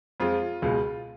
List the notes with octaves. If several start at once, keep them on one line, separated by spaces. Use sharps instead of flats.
F2 F3 G#3 F4
C#2 B2 G#3